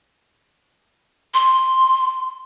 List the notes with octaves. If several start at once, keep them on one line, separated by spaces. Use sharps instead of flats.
C6